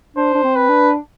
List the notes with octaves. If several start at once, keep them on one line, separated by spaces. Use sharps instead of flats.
D4 C5
D4
C4
B4
D4